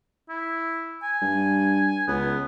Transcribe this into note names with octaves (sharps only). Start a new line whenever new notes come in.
E4
G#5
G2
C#2 B3